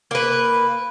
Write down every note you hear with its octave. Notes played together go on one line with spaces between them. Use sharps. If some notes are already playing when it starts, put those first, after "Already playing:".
A#3 B4